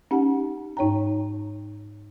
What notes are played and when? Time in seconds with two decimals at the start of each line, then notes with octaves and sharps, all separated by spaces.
0.11 C#4 D#4 G4 F#5 A5
0.77 G#2 D#4 C#5 G5 A#5